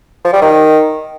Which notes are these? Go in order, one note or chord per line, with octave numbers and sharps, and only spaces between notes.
F3
G3
D#3